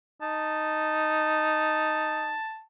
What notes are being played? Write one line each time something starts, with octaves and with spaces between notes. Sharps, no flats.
D#4 A5